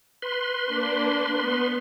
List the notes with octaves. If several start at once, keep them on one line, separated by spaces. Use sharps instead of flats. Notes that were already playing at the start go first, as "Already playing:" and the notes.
B4 C6
A#3 D4
B3